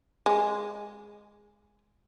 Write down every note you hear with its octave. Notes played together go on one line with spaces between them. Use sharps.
G#3